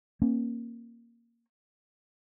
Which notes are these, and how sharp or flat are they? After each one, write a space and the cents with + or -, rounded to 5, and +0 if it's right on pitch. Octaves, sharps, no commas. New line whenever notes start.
A#3 +0 C#4 -35